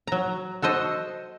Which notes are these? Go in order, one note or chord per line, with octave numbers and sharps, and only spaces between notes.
F#3 A#5
F#4 A4 C5 D#5